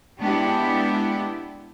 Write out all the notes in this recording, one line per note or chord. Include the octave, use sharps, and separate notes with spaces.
G#3 B3 D4 E4 G4